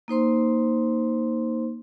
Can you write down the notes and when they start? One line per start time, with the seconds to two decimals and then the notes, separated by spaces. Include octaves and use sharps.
0.08 A#3 D#4 C5 C6